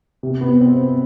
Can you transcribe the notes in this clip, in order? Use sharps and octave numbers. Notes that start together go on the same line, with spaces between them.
C3
B3
C4